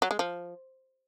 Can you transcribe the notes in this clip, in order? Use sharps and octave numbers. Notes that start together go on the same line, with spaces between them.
F#3
G#3
F3